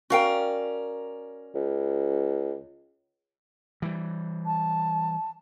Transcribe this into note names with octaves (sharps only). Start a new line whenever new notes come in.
C#4 F#4 A#4 D5 F5 G5
C#2
E3 G3
A5